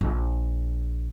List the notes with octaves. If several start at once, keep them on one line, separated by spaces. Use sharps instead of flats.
A#1